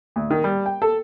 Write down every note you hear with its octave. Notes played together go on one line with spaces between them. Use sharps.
D2
D#3
G3
G5
A4